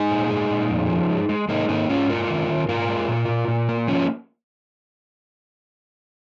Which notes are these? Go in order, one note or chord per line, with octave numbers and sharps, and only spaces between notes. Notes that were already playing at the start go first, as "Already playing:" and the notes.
Already playing: G#3 D#4 G#4
A#2
G#3
A#2
F2
F3
G#3
G#3
G#3 A#3 D#4
G#2 A#3 D#4
G#2 C#4 F4
G#3 F4 A#4
D#3
D#3
G#2 F4 A#4
G#3
A#2
A#2
A#2
A#3
F3 C#4 F4